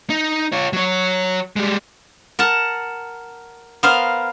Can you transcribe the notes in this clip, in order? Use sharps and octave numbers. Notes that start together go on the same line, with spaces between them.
D#4
F4 C#5
F#3 C#5
G3 G#3
A#4 F#5 A5
B3 A#4 C5 F5